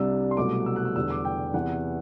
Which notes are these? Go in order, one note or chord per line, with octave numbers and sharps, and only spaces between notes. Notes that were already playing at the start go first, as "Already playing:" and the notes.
Already playing: C2 C3 G3 D4 E6
C6
C2 B2 F#3 A3 D6
E6
F#6
E6
E2 D3 G3 E6
D6
G5
E2 C3 E3 F#5